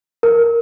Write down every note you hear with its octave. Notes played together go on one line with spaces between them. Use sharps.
A#4